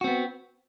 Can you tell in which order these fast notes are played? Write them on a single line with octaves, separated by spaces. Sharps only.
F#4 C4 B3